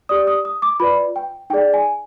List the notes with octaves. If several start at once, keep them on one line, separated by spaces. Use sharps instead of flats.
G4 D5 D#6
D#6
D#6
D6
F4 B4 D5 B5
G5
D#4 G#4 D5 G5
G#5